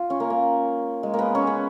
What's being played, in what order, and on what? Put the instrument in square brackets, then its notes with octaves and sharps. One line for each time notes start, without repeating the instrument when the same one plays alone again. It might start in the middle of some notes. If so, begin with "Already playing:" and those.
Already playing: [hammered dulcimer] F4
C#4
A#3
A#3
G#3
A#3
B3
C#4
B3